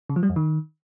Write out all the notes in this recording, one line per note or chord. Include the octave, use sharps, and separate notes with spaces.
C#3
F3
G3
F2
D#3